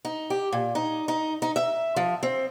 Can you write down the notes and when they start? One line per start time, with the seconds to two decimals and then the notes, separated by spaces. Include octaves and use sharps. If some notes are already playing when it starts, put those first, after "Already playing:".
0.05 D#4
0.30 G4
0.52 A#2
0.75 D#4
1.08 D#4
1.42 D#4
1.56 E5
1.96 F3
2.23 C4